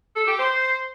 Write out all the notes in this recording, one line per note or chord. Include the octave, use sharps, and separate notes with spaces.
A4
G4
C5